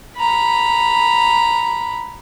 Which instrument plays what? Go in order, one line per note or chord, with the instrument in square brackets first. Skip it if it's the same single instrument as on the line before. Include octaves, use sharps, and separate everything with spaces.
[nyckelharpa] A#5 B5